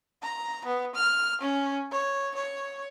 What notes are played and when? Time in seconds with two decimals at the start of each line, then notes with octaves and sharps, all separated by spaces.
0.23 A#5
0.66 B3
0.95 F6
1.41 C#4
1.92 C#5
2.35 C#5